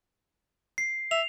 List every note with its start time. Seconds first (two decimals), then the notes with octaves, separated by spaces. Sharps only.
0.78 C7
1.11 E5 F7